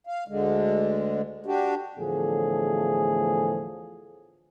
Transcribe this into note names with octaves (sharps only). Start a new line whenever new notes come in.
F5
D2 D3 G#3
D4 F#4 G4
E2 A2 D3 F3 A3 G#4